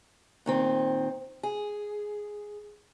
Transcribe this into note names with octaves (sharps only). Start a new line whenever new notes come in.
A#2 D#3 C4
G#4